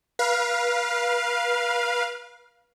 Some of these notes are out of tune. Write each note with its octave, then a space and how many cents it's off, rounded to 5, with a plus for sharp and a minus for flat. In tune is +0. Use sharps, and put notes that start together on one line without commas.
B4 -35 F5 +0